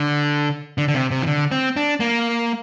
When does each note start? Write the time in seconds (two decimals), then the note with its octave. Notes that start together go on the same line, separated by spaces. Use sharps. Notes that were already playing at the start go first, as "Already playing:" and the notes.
Already playing: D3
0.78 D3
0.88 D3
0.94 C3
1.11 C3
1.22 E3
1.27 D3
1.51 C4
1.76 D4
2.00 A#3